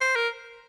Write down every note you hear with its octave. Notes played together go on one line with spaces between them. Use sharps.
C5
A#4